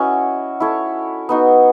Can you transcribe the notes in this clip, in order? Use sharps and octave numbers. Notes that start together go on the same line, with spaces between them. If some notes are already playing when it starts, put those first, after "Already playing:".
Already playing: C#4 E4 F#4 C#5 D#5
E4 A4 C#5
B3 D#4 F#4